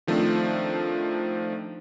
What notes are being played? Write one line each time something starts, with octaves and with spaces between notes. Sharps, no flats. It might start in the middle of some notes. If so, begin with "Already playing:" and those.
D#3 F3 A3 C4 D4